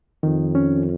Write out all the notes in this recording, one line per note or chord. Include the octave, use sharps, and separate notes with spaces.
F2 D#3
C#4